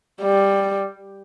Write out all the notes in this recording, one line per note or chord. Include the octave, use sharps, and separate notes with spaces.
G3